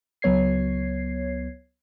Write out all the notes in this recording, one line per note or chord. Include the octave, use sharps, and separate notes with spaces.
C#2 F#3 B3 C#5 G#6 C7